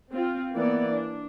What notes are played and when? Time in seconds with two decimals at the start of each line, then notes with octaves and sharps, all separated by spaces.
0.11 C4 F4
0.54 E3 A#3 B3 D5
0.91 D4